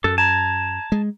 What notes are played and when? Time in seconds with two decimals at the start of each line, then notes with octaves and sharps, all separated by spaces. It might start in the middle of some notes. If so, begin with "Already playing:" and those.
0.04 F#2 A4
0.18 A5 A#5 G#6
0.92 G#3